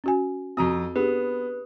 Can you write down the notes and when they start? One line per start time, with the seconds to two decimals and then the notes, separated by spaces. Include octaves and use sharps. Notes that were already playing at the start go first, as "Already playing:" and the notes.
0.04 C#4 F#4 G#5
0.57 F2 C4 F#4 A#5 D#6
0.96 B3 D4 G4 G#4 B4